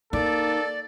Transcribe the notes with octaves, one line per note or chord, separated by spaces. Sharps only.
A#3 D#4 A4 D5